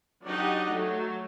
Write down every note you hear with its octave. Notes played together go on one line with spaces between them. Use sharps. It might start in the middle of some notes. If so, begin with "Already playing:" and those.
F#3 D4 D#4 G4 D#5 F#5
F#3 A3